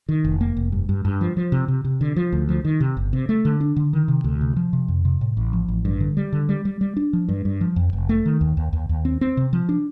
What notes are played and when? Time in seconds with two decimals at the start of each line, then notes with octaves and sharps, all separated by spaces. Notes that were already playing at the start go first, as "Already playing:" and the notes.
0.09 D#3
0.24 F1
0.41 A#3
0.57 F1
0.72 G2
0.89 G2
1.05 G2
1.21 F3
1.37 F3
1.52 C3
1.68 C3
1.85 C3
2.01 D3
2.16 F3
2.33 D2
2.49 F3
2.65 D#3
2.80 C3
2.97 G1
3.13 C3
3.29 A3
3.45 D3
3.60 D4
3.76 D3
3.93 D#3
4.08 C3
4.24 D2
4.41 C3
4.56 F3
4.73 C3
4.88 F2
5.05 C3
5.21 A2
5.37 A1
5.53 F3
5.68 A1
5.85 G2
6.00 D3
6.17 G3
6.33 D3
6.49 G3
6.65 G3
6.81 G3
6.97 D4
7.13 F3
7.29 G2
7.45 G2
7.61 F3
7.76 F2
7.93 F1
8.09 A3
8.25 D#3
8.41 D#2
8.57 D#2
8.73 D#2
8.89 D#2
9.05 C4
9.21 C4
9.37 C3
9.53 F3
9.69 D4